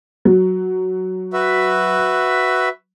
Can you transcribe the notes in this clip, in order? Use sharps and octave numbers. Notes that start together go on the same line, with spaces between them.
F#3
F#4 B4 E5